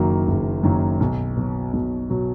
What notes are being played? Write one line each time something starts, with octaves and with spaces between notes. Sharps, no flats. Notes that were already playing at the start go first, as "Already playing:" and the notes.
Already playing: F#1 F#2 D#3 F#3 A#3
F#1
F#2 D#3 F#3 A#3
B1
B2 F#3
B1
B2 F#3